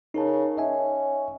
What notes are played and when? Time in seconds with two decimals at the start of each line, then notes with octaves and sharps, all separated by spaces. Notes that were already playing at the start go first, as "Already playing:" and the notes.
0.14 C#3 D#4 A#4 A5
0.58 C#4 D#5 E5 G#5